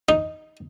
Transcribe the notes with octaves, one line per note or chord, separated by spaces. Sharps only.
D#4